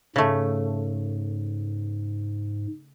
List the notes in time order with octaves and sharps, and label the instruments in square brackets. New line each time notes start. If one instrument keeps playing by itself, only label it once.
[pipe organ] G#2 [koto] C#3 A3